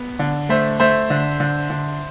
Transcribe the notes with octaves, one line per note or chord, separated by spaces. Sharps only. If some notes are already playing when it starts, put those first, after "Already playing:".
Already playing: B3
D3
A3 C5 E5
A3 C5 E5
D3
D3
D3